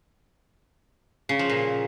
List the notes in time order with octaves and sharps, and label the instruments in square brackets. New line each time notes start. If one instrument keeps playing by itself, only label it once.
[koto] C#3
F3
A#2